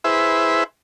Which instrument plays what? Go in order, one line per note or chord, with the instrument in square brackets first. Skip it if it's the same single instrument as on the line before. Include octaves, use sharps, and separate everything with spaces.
[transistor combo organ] E4 G#4 B4 C5 E5